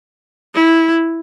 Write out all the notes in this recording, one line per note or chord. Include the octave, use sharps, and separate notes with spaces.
E4